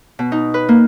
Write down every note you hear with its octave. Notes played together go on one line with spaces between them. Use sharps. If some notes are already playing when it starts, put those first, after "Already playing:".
B2
D#4
B4
A#3